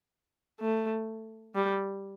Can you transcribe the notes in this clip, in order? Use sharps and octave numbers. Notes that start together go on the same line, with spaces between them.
A3
G3